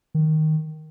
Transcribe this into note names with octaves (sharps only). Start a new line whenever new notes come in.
D#3